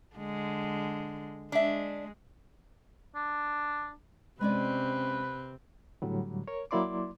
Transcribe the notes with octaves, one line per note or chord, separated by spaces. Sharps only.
D3 G#3
G#3 D4 E5
D4
C3 G#3 C4 C#4 B4 D5
A2 D3 F#3 G3
A#4 C#5
F#3 A#3 E4 D5 C6 D6